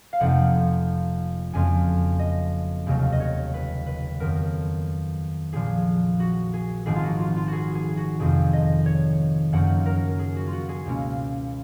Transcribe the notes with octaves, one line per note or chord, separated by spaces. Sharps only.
F5
F1 F2 F3 A#3 D#4 F#5
F#1 F2 F3 G#5
D#5
F1 D#2 C#3 F#3
D#5
C#5
B4
B4
F2 D#3 F#3 B3 A#4
A#1 A#2 F3 G#4
F#4
G#4
G#1 G#2 F3 G#4
F4
F#4
F4
F4
F#4 G#4
G#4
F#4
F1 F2 D#3 G#4
D#5
C#5
F#2 C#3 F3 A#3 D#4 F#5
A#4
G#4
F#4
F4
F#4
G#4
C#2 B2 A#3 C#4